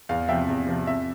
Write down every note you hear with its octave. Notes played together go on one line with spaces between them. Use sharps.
E2 F5
C3 F3 E5 G5
E2
C3 F3
F2 E5